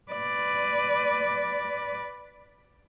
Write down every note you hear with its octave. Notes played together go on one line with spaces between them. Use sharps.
B4 D5